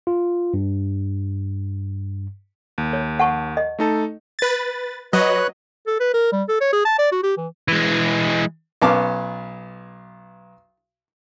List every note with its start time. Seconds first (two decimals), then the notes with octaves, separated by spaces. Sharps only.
0.07 F4
0.54 G2
2.78 D#2
2.93 C#5
3.19 F#5 A5 C#6
3.57 D#5
3.79 A3 D#4 A4
4.39 B4 A6
5.13 F#3 B4 C#5 D#5 F#6
5.87 A4
6.00 B4
6.14 A#4
6.32 G3
6.49 A4
6.61 C#5
6.73 G#4
6.85 A5
6.99 D5
7.12 F#4
7.23 G4
7.38 E3
7.68 E3 G#3
8.82 B1 B3 C#4 F5 A5 D6